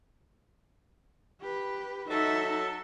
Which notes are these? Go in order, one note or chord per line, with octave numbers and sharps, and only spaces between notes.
G4 B4
F#3 D#4 A4 E5